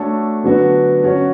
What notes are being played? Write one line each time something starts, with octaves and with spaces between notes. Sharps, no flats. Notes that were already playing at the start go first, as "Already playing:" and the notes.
Already playing: A3 D4 F#4 A4 C#5
D3 F#3 B3 D4 F#4
F#3 C#4 F#4 C#5